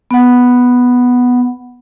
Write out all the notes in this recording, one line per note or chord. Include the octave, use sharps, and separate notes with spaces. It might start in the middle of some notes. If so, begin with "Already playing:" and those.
B3 F#5